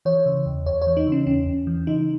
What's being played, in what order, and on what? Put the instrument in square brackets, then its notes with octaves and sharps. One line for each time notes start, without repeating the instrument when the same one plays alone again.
[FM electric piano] E3 C#5
C#3
E2
E2 C#5
C#5
E3
D#4
C#3
C#4
E2 C#4
E2
E3
C#3 D#4